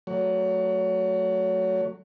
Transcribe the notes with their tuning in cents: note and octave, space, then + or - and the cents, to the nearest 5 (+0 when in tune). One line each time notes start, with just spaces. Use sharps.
F#3 +0 A3 +15 C#5 +30